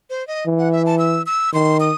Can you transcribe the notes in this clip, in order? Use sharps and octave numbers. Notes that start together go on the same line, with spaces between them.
C5
D#5
E3
F#5
E5
A5
E6
E6
D#3 C6
D#6